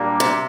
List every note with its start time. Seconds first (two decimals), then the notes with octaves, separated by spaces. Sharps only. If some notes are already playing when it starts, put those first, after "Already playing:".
Already playing: A#2 G3 A#3 D4
0.20 C3